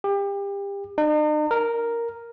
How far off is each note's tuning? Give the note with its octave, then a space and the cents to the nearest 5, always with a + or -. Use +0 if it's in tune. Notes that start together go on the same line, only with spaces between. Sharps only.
G4 +30
D#4 -45
A#4 +0